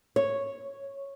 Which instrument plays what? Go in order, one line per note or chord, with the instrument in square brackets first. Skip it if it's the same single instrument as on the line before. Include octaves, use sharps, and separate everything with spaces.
[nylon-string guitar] C#5